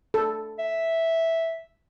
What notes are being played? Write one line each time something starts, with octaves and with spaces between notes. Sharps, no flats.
A4
E5